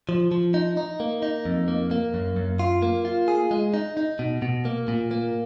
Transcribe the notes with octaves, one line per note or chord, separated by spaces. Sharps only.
F3
F3
D#4
D#4
A#3
D#4
F2
A#3
A#3
F#2
F#2
F4
A#3
F4
G#4
G#3
D#4
D#4
B2
B2
A#3
A#2
A#3